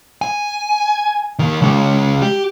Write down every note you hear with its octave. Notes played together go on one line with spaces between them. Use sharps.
G#5
D#2 D#3
C#3 G#3
G4